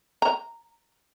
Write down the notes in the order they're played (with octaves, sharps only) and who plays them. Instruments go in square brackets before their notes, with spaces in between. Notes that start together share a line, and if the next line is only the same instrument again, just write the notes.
[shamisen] A#5